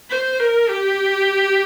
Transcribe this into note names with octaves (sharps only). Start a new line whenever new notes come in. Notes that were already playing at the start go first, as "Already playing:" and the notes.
C5
A#4
G4